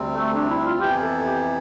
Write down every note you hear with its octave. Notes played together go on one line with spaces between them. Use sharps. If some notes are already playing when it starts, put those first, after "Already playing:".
Already playing: D2 C3 G3 C4
A3
D4
E4
F4
F2 C3 E3 B3 E4 G4
A4
G4